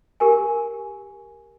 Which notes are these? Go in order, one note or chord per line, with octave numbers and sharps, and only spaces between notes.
G4 A#4 G#5